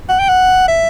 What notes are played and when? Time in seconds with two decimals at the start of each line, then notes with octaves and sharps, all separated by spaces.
0.09 F#5
0.19 G5
0.29 F#5
0.68 E5